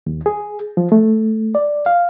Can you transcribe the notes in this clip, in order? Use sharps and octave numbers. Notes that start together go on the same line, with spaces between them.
D#2
G#4
F3
A3
D5
F5